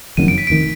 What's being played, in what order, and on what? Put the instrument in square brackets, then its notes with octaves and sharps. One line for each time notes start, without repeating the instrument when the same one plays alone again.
[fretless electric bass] F#1 F2 D#3 F#3 [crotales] D#7
[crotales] D7
B6
[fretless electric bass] F1 D#3 [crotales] D7